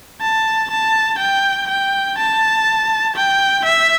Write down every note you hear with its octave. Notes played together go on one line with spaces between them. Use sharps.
A5
A5
G5
G5
A5
G5
E5